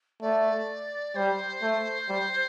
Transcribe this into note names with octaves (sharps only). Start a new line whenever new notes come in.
A3 D5
G3 C5
A3
G3